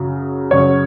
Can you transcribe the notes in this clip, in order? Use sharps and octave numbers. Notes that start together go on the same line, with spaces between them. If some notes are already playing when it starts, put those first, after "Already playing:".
Already playing: F#2 C#3 F#3
F#2 C#3 F#3 C#5